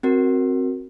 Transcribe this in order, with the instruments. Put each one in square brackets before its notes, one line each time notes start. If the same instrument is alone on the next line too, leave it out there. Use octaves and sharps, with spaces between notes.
[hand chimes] C4 F#4 A#4